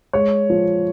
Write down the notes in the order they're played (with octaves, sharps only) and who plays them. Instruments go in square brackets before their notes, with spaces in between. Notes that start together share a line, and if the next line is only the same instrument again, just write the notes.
[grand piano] G#3 C#5
F3